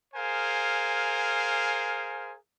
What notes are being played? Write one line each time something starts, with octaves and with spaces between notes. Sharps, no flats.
G#4 A#4 C5 F5 G#5